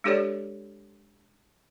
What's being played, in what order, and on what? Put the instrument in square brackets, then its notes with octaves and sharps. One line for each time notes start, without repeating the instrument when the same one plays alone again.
[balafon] G#3 D4 G4 A4 C#5 D5